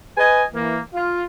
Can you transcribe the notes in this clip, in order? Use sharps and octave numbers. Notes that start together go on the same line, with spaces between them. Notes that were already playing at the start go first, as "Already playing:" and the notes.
B4 D#5 G#5
E3 A#3
F4